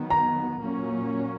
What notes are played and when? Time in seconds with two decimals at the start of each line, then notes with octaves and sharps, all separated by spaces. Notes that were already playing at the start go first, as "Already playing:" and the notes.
Already playing: D#3 F#3 B3
0.10 A#5
0.61 A#2 F#3 A#3 C#4